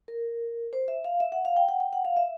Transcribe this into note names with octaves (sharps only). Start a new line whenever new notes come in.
A#4
C5
E5
F5
E5
F#5
F5
G5
F#5
G5
F#5
F5
E5